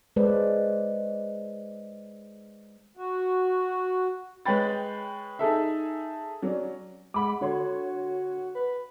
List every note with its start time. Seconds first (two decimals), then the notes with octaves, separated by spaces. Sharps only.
0.16 G#3 B4 C5 D5
2.97 F#4
4.45 G#3 B4 C#5 G5 B5 A6
5.39 D#4 G#4 A4 E5
6.42 F#3 C#4 D5
7.14 G#3 F#5 B5 D6
7.41 D3 F#4 C#5 C6
8.55 B4